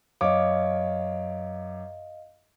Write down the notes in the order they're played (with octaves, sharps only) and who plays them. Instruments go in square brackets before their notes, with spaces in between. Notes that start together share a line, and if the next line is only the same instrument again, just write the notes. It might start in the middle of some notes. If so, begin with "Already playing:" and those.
[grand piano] F#2 C#5 D6 [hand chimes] D#5 F5